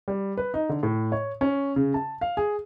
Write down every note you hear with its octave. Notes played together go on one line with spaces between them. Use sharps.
G3
B4
D#4
D3
A2
C#5
C#4
C#3
A5
F5
G#4